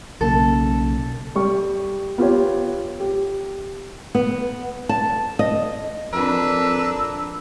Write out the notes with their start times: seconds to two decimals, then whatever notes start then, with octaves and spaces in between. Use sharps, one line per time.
0.21 B1 C#3 A#3 A4
1.35 G3 C#6
2.18 B3 F4 G4 C#5
3.00 G4
4.15 B3
4.89 A5
5.39 D#5
6.13 F2 D4 A#4 B4 E6